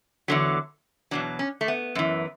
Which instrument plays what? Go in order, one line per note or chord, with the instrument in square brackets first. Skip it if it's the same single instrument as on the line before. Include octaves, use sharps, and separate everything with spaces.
[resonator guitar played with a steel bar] E2 D3 F#3
E2 B2 F#3 D4
C#4
A3
B3
F#2 E3